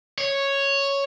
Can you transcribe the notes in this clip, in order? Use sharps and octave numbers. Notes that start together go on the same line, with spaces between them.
C#5